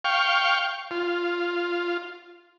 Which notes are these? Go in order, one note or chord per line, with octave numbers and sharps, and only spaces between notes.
F5 G5 C#6
F4